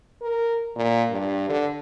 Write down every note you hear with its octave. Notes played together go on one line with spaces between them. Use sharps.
A#4
A#2
G2
D3